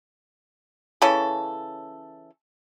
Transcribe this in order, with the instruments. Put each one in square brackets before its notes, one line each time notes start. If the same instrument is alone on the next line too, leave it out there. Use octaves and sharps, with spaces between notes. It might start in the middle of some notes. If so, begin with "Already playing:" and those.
[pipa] C#3 E3 C#4 A4